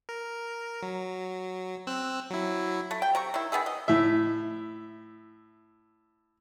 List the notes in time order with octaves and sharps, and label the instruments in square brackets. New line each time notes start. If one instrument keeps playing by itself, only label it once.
[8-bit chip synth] A#4
F#3
C4 E6 F#6
F#3 E4
[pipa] A3
G5
C3 A#5 C#6
D#3 E4
D#3 B3 G#4 E5
D#5
[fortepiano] A2 E5